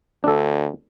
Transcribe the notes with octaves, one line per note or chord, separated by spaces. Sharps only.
D2 D4 A4